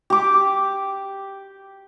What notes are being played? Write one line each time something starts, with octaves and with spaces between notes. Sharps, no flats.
G4 D6